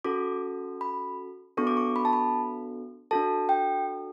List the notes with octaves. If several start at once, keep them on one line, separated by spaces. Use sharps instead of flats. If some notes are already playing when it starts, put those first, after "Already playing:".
C#4 F#4 A4 D6
B5
B3 D4 F#4 A4 C#6
D6
C#6
B5
A5
B5
D4 F#4 A4 A5
G5